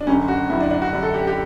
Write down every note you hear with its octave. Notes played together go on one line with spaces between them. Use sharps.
D4
F#1 F#2 D3 C#4
F#4
F#1 F#2 D3 E4
D4
D4
F#4
F#1 F#2 D3 D4
A4
G4
G4